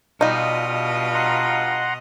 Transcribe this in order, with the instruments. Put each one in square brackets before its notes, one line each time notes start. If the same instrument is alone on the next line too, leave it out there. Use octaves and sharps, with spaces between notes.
[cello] B2 D#5 [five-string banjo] G3 D#4 [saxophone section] D4 F4
[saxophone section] G2 F4
[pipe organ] F#5 A#5 C6